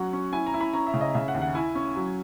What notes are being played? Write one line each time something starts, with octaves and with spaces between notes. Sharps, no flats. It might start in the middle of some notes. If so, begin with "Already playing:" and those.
Already playing: F#3 C#4 F#5
C#4
E4 G#5
A#5
E4
B5
C#4 A#5
E5
C#3
D#5
C#3 E5
F#5
D#2
F#5
E4 G#5
C#4
F#3